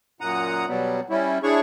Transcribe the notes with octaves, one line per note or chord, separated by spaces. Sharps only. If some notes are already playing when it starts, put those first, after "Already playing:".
F#2 A#2 F#5 A#5 D#6
B2 F#3 G3 B3
G3 C#4 E4
D4 E4 G#4 C#5 C#6